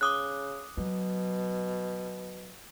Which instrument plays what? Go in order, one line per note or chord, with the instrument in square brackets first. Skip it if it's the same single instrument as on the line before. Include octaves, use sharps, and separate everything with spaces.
[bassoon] C#3 [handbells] D6 D#6 F#6
[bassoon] B2 [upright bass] F#3